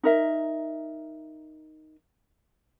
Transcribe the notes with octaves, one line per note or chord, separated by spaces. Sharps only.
D#4 A#4 E5